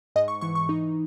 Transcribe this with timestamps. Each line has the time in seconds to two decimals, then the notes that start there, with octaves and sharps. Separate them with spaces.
0.16 G#2 D#5
0.28 C#6
0.41 E3 C#6
0.55 C#6
0.69 D#4